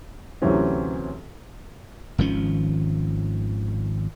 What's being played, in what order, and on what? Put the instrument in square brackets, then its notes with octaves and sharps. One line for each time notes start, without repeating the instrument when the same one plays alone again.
[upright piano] D2 C3 E3 F#3 C4 C#4
[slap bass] G#1 D#3 F3 C#4